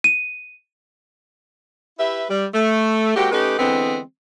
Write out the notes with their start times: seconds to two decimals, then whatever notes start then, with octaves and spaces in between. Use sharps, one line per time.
0.04 D#7
1.99 E4 G4 B4 E5
2.30 G3
2.54 A3
3.16 G#3 A#3 C4 F#4 G4
3.32 A3 C#4 D#4 G4 A4 B4
3.59 D3 E3 G#3 B3 C4